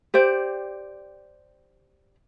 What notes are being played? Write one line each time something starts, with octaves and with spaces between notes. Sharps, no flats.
G4 C5 D5